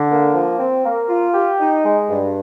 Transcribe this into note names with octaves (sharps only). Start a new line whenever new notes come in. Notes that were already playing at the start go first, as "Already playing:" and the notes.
Already playing: D3
A#3
F3
C4
A#3
F4
G4
D#4
G#3
G2